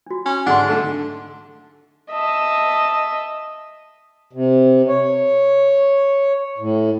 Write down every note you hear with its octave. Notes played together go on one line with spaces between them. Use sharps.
D4 F#4
C#4
G#2 D3 D4 F#5 A5 C6
D3 A3 A5
D#5 E5 A5
C3
C#5
A2